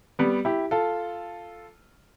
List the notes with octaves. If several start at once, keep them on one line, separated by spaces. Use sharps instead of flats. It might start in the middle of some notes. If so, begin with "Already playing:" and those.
G3 B3
E4 G4
F4 A4